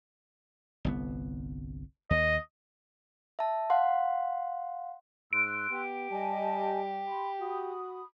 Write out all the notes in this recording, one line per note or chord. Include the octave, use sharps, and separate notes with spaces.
G1 C2 B3
D#2 D#5
E5 A5
F5 F#5 C6
G#2 C6 E6 F#6 D7
B3 G4
G3 D#5 G#5 A5
B5 C6
F#4 B5 D#6